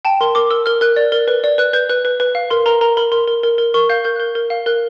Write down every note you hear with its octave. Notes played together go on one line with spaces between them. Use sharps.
G5 A5
A#4 C6
A#4 D6
A#4 E6
A#4 F6
A#4 F#6
D5
A#4
B4
D5
B4 F#6
B4 G6
B4 F#6
B4
B4
F5
A#4 C6
A#4 A#5
A#4 A#5
A#4 B5
A#4 C6
A#4
A#4
A#4
A#4 C#6
F5 G6
A#4 G6
F#6
A#4 G6
A#4
F5
A#4 F#6